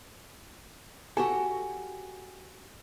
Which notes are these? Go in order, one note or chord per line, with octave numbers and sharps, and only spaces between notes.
F#4 G4 A4 G#5